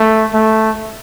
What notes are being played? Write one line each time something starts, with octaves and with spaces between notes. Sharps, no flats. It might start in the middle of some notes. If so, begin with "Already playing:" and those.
Already playing: A3
A3